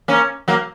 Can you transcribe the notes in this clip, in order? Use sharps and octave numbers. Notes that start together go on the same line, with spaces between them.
A#3 C#4
F#3 A#3